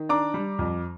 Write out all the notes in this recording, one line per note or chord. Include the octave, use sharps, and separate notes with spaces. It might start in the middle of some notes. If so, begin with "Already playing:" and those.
Already playing: D#3
D4 A#5 D6
G3
F2